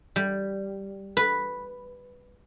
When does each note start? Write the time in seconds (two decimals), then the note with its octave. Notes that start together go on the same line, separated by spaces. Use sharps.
0.16 G3
1.17 B4